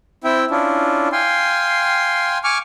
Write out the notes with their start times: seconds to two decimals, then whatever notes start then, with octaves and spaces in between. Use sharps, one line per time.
0.24 C4 E4 E5 G5
0.51 C#4 D4 E4 F4
1.12 F5 G5 G#5 C6
2.44 G#5 C#6 D6 F6